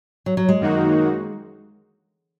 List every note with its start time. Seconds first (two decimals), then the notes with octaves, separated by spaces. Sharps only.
0.26 F#3
0.37 F#3
0.49 G#3
0.61 F#2 D#3 A#3 D#4 F#4